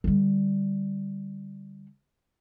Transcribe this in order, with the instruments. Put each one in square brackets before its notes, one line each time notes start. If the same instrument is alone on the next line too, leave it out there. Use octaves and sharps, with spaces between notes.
[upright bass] D3 G3